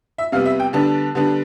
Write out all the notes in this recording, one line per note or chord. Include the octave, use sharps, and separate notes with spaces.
E5
C3 G3 B3 F5
E5
G5
D3 G3 B3 D4 A5
D3 G3 B3 D4